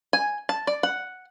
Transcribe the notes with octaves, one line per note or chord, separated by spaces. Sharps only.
G#5
A5
D5
F#5